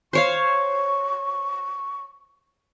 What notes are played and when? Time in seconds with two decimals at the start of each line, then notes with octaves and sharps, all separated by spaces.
0.13 C5 C#5 F5 C#6